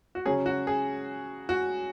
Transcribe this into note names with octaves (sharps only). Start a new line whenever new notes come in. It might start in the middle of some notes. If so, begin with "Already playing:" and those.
F#4
C#3 F#3 C#4 G#4
F#4
G#4
F#4